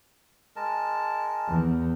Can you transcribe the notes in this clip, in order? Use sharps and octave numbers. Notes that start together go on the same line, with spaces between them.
G#3 A#4 A5
E2